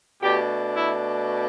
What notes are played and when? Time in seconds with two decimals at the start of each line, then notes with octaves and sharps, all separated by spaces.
0.21 B2 A3 D4 G4
0.76 E4